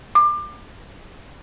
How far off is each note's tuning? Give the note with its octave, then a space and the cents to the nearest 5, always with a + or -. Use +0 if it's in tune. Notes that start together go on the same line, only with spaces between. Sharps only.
D6 +30